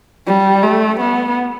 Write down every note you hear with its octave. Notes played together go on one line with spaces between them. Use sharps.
G3
A3
B3